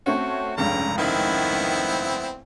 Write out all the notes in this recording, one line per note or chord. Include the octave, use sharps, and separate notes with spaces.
A3 C4 C#4 F#4
F1 C#2 G2 C#3 A#5
D#3 B3 C4 E4